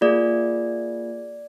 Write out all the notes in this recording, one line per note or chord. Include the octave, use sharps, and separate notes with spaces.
A#3 F4 G#4 D5